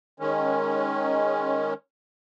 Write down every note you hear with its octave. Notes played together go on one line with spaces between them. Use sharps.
D#3 G#3 C#4